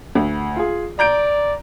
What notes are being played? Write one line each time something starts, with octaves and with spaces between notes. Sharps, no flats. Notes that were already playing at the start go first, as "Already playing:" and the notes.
D2
F4 G#4
D5 A#5 G6 D7